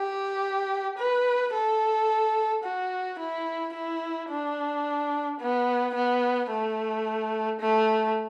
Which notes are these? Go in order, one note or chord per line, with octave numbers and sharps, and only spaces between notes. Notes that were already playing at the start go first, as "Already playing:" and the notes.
Already playing: G4
B4
A4
F#4
E4
E4
D4
B3
B3
A3
A3